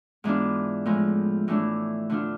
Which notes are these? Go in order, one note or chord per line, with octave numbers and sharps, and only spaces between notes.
G#2 E3 B3 D4 F4
A2 F3 G#3
A2 E3 A3 D4
D3 A3 D4 F4